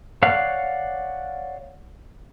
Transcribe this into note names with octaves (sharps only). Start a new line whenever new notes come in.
C#5 D5 F5 F#5